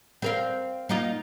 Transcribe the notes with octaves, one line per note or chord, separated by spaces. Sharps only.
C4 A#4 F5
A#3 D#4 F4